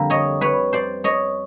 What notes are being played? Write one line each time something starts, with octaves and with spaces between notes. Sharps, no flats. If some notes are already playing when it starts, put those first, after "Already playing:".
Already playing: F2 D3 G3 A#3
C#5 D#5
B4 C#5
C5 D5
C#5 D#5